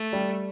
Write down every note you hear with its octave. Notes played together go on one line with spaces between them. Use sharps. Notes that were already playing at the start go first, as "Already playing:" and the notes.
Already playing: A3
G3